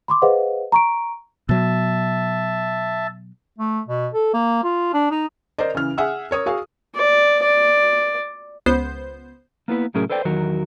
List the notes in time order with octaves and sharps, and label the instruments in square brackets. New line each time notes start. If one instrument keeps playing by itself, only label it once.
[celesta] B5 C6 D6
G#4 B4 C5 D#5 F5 F#5
A#5 C#6 D7
[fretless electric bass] B2 F#3 [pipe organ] E5 A5
[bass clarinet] A3
B2
A4
A#3
F4
D4
D#4
[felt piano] A#4 C5 D5 D#5
C#3 E3 F6
G#4 E5 F#5 E6
A#4 C#5 D#6
F#4 G#4 F5
[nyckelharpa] D5
D5
[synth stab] C#2 B3 C5 G6
[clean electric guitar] A#3 B3 E4 B4
C2 A2 F#3 C#4 G#4 A#4
A4 B4 C5 D5 G5
E2 D#3 F#3 F#4 A#4